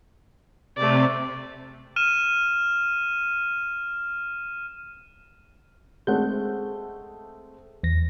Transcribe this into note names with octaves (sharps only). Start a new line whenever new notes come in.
C3 A3 D5
F6 D#7 E7
G#3 A3 C4 F#5 G6
E2 A#6